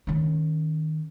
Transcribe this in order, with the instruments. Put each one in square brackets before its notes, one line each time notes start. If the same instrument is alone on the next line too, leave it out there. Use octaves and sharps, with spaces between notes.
[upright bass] D#3 C#4